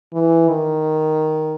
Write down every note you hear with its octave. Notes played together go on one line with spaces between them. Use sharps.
E3
D#3